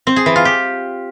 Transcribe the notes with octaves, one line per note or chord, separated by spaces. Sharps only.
C4
G#4
E3
F4
G4